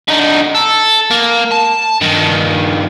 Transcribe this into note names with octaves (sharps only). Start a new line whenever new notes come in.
D3 D#4
A4
A#3
A5
G2 D#3